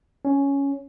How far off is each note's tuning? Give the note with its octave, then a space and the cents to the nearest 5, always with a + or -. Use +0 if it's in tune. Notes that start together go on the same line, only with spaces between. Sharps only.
C#4 +5